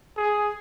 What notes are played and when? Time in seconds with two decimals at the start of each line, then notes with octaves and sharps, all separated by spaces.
0.17 G#4